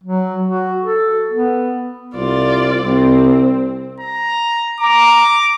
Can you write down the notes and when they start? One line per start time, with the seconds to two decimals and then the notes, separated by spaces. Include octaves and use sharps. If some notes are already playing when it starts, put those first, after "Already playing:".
0.03 F#3
0.47 F#4
0.82 A4
1.31 B3
2.15 C2 F4 D5
2.84 C2 C4
4.00 A#5
4.80 A#5 D6